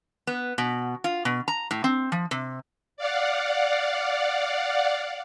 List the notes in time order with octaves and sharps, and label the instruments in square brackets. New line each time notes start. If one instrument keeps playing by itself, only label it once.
[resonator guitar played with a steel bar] B3
B2
F4
B2
A#5
A2
C4
F3
C3
[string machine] D5 F5 F#5